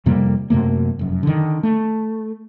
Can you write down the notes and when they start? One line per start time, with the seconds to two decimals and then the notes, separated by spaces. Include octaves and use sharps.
0.06 F2 C3 G3 A#3
0.50 F#2 C3 A3 A#3
0.99 F1 F#2
1.23 D3 D#3
1.63 A3